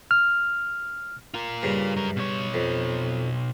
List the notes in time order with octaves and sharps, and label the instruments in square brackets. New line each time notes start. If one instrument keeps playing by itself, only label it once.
[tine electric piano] F6
[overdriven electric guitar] F4 A#4
[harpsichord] G2 C#3
[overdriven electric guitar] F#2 A#4
B2 C#5
[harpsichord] F2